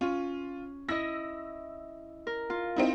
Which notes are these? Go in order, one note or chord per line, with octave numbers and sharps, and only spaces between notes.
C#4 F4
E4 D#5 E6 A#6
A#4
F4
C4 D#4 E4